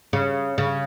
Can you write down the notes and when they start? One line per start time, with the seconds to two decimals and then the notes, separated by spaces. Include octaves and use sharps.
0.13 C#3
0.58 C#3